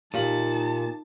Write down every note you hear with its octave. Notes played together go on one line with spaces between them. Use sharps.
A#2 D#4 G4 F5 A5 F#7